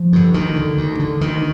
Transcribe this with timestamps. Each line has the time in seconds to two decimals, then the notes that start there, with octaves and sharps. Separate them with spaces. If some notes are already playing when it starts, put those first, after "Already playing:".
Already playing: F3
0.13 G2 D3
0.34 D2 D#3
0.56 D3
0.77 D2
0.99 D3
1.21 D2 D#3